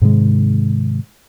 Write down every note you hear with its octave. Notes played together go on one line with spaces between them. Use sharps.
G#2 C3 D#3 G#3